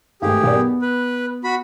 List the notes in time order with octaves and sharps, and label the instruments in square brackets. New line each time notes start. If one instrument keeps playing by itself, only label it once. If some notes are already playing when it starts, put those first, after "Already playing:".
[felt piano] G#1 A3 [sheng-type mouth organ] G4 G#4
[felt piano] B1 A#4 D5
B3
[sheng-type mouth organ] B4
F#4 B5